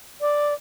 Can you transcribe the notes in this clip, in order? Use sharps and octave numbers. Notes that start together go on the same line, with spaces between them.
D5